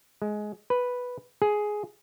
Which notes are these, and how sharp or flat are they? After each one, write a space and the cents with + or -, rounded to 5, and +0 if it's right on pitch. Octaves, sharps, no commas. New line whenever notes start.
G#3 +15
B4 +0
G#4 +10